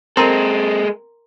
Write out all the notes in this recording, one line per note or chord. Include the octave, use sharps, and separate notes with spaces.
G#3 C4 A4 A#4 A#5 C6